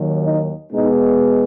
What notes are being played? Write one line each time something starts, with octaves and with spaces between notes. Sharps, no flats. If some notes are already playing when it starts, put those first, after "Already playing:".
Already playing: D#2 D#3 F#3
D#4
B2 G#3 B3 D#4